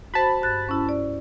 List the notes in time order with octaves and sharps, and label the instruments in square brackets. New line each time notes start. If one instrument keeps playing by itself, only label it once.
[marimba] F#4 C5 [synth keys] A5 B5
[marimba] G2 F#6 A6
C#4 E4
D5